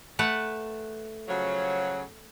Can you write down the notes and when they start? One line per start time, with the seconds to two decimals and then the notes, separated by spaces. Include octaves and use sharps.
0.19 A3 B4 F#5
1.28 C#3 F3 F#3